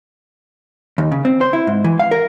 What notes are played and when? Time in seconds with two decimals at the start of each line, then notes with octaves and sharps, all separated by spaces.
0.98 D#2
1.12 C#3
1.25 C4
1.41 C5
1.53 E4
1.67 G#2
1.84 E3
1.99 F5
2.11 A#4